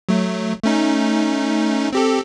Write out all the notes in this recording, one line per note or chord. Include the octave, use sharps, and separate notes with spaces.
F#3 A3
A3 C#4 D#4
C4 G4 A4